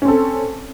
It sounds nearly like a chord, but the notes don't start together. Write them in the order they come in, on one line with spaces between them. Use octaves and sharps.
C#4 C4 A4